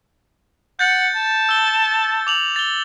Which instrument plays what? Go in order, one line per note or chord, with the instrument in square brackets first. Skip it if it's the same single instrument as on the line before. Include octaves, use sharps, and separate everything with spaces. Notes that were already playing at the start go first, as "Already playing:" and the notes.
[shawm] F#5 [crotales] G6 A6 C#7
[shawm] A5
[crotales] E6 G7
D6 F7 F#7
A6 G7